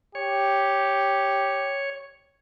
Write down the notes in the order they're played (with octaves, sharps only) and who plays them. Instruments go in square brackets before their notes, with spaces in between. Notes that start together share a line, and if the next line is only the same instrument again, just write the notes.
[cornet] G4 [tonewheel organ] C#5